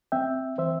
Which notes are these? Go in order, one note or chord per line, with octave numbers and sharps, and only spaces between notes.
C4 E5 G5
E3 C5 E5